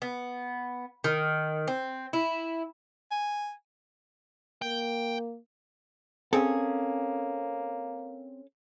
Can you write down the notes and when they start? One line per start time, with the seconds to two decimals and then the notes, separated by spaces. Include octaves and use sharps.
0.02 B3
1.04 D#3
1.68 C4
2.13 E4
3.11 G#5
4.62 A#3 G5
6.33 A#3 C4 C#4 G#4 A4